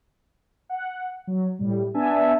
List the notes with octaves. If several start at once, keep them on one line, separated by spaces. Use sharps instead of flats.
F#5
F#3
A2 G3
B3 D4 E5 G#5 A5